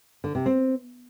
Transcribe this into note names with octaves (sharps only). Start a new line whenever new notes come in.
D3
C3
C4